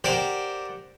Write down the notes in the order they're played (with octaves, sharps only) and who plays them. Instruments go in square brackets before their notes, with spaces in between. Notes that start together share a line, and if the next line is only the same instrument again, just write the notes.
[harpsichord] G4 A#4 C5 D5 F#5 A5